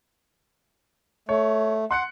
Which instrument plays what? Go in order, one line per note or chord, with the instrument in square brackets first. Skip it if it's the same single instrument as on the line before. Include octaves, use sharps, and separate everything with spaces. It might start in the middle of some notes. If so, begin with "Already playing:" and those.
[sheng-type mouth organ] A3 [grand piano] C#5
[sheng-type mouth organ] F#5 [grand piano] C6 F#6 C#7